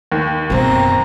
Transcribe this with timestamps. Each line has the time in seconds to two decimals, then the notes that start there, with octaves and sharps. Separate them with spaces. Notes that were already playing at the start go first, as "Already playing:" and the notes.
0.12 D#2
0.50 F#2 B2 C4 A#5